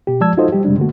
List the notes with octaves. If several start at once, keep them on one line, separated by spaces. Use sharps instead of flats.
B2 G4
F3 G#3 D5 A5 E6 G#6
D#4 F4 F#4 A4 C5 D#5
G3 G4
F#2 C3 G3 G#3 D4
D3 A3 A#3 F#4